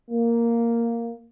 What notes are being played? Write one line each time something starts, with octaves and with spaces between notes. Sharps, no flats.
A#3